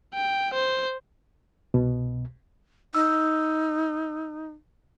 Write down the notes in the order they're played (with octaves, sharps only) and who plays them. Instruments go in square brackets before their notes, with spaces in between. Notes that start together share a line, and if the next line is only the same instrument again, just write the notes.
[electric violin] G5
C5
[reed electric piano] C2 B2
[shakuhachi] D#4 [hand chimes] E6